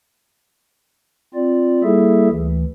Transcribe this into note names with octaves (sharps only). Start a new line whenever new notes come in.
C4 F4 D5
G3 A#3 E4 G#4 A4 E5
D2 E3